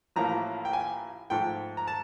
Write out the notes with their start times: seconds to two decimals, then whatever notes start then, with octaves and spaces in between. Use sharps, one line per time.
0.16 A1 A2 F3 A#3 A#5
0.65 G5
0.73 G#5
1.30 G#2 F3 A3 G5
1.77 A#5
1.88 A5